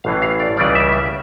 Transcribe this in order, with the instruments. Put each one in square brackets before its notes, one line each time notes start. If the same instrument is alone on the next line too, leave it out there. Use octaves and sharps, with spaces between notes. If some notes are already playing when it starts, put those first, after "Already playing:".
[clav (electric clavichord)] A1 A2 E3 F5
F5
D5
C#2 C#3 E3 G3 D5
E5
E5